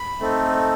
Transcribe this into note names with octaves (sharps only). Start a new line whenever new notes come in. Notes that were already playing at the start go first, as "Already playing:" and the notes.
Already playing: B5
A3 C4 D#4 A4